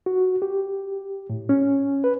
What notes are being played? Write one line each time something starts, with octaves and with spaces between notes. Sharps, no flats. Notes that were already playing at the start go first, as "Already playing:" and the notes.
F#4
G4
A2
C#4
B4